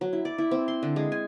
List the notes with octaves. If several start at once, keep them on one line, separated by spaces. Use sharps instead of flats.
F#3
E4
D5
E4
C4
C6
D3
G#3
G#5